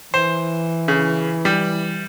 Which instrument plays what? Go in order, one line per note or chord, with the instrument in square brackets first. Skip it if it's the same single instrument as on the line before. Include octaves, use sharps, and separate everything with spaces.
[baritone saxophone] E3 [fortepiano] C5
[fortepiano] C#3
G3